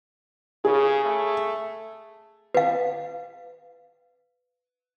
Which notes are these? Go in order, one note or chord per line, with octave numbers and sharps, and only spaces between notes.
C#3 G#4
A3
B4 F5